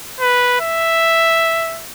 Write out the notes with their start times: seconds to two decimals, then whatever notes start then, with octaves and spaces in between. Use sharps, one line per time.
0.20 B4
0.60 E5